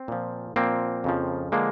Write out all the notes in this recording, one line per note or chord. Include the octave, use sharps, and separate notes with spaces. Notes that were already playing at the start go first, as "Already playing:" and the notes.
Already playing: C4
A#2 F3
A#2 F3 A#3 C4
F2 C#3 F3
D3 F3 G#3 A#3